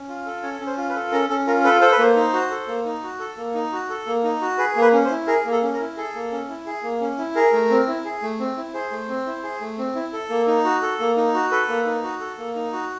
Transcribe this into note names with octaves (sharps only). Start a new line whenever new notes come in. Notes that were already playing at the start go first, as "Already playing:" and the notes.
Already playing: C#4
F4
A4
C#4 C#5
C#4
C5
F4
B4
A4
C#4 A#4
C#4 A4
F4 A#4
A4 B4
A4 C5
B4
A#3 C5
D#4
F#4
A4
A#3
D#4
F#4
A4
A#3
D#4
F#4
A4
A#3
D#4
F#4
G#4 B4
A#3
B4
C#4
C5
E4
G#4 A#4
A#3
A4
C#4
A#4
E4
G#4 A4
A#3
C#4
E4
G#4
A#3
C#4
E4
G#4 A#4
A3
C4
E4
G#4
A3
C4
E4
G#4 C5
A3
C4
E4
G#4
A3
C4
E4
A4
A#3
D#4
F#4
A4
A#3
D#4
F#4
A4 B4
A#3
D#4
F#4
A4
A#3
D#4
F#4